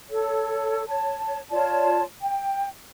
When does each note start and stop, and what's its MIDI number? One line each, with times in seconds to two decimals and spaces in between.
0.10 0.85 69
0.10 0.85 73
0.87 1.40 73
0.87 1.40 81
1.50 2.03 65
1.50 2.03 73
1.50 2.03 74
1.50 2.03 81
2.21 2.68 79